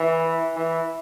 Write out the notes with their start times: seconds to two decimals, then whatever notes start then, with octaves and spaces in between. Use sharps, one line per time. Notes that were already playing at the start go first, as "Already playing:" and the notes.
Already playing: E3
0.56 E3